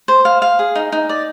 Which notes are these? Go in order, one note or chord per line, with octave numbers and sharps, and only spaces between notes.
C5
F5
F5
G#4
D#4
D#4
D5